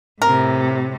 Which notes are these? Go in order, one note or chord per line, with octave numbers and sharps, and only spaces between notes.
A2 C3 A#4